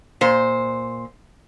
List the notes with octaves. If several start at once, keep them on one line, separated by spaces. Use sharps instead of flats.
A#2 C5